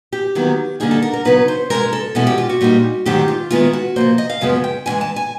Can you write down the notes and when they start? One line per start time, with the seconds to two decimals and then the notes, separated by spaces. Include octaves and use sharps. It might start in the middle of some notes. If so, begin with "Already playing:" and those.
0.12 G4
0.35 D#2 D#3 F#3 B3 E4
0.80 D3 G3 A#3 D#4 G#4
0.91 A4
1.02 A#4
1.14 A#4
1.25 C#3 F#3 B3 D#4 B4
1.48 C5
1.70 C3 D#3 G#3 A#4
1.93 A4
2.15 E2 B2 G#3 C#4 E4 A4
2.27 G4
2.38 F4
2.49 F#4
2.61 A#2 G3 A#3 D#4
3.06 G#2 D#3 F#3 A3 C4 G4
3.28 F4
3.51 D#3 G#3 B3 E4 F4
3.73 F#4
3.96 C3 F3 A#3 C5
4.18 D#5
4.30 F5
4.41 F#2 C#3 F3 G#3 B3
4.64 G5
4.86 F#2 C#3 E3 G#3 G#5
5.01 A5
5.16 G#5